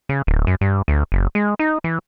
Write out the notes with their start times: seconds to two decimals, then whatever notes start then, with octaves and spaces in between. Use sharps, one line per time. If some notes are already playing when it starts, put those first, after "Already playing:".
0.09 C#3
0.27 D1
0.47 F#2
0.61 G2
0.88 D2
1.12 F#1
1.35 G#3
1.59 D#4
1.84 E3